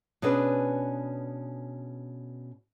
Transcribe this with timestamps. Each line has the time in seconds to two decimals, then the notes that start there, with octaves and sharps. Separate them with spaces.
0.22 B2 C#4 D4 G#4 B4